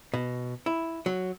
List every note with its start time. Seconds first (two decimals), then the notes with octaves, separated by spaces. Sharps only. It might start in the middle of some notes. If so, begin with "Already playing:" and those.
0.14 B2
0.66 E4
1.06 F#3